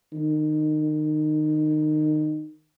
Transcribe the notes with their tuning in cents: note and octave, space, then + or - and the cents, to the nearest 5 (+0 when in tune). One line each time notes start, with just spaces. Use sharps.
D#3 -25